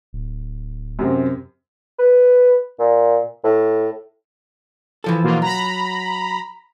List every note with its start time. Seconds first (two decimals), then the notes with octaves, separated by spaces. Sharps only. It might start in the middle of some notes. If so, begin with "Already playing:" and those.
0.13 D1
0.99 F#2 C3 C4
1.99 B4
2.79 A#2
3.44 A2
5.04 E3 F3 A4
5.23 B2 A#3 F4
5.42 F#3 A#5 B5